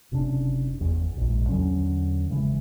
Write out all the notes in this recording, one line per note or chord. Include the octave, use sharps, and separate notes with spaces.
F#1 C3 C#4 D4
G1 E2
A#1 G#2
E2 D3 F#3 C#4
G1 C#3 E3 G#3